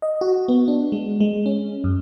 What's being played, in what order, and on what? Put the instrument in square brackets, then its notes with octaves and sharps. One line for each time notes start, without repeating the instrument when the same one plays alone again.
[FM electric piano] D#5
F#4
B3
D4
G#3
G#3
C#4
F#2